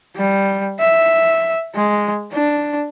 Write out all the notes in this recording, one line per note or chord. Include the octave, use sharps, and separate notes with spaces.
G3
E5
G#3
D4